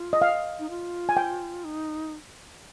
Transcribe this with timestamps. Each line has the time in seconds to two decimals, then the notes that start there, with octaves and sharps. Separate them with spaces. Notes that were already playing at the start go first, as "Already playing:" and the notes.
Already playing: F4
0.13 D#5
0.22 F5
0.59 D#4
0.70 F4
1.09 G#5
1.17 G5
1.64 D#4